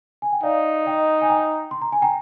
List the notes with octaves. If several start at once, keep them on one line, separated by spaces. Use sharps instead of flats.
G#5
G5
D#4 D5 F5
D#5 G5
G#5
G5 A#5
C6
A#5
G#5
G5 A#5